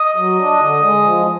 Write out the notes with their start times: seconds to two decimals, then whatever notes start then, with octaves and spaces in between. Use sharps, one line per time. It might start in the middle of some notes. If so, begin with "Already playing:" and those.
Already playing: D#5
0.16 F#3
0.38 D4
0.59 D3
0.82 G#3
1.04 F3